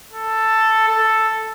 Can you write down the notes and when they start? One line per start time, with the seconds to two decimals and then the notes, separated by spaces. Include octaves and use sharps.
0.13 A4
0.88 A4